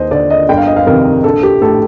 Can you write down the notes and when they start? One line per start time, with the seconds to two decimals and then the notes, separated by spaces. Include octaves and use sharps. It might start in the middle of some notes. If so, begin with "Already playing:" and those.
Already playing: D#2 C5 D#5
0.11 D3 D5
0.30 D#5
0.49 G1 G5
0.58 F5
0.67 D#5
0.76 F5
0.86 F2 C3 D#3 A#4
1.24 A#1 A4
1.43 G4
1.62 A2 A4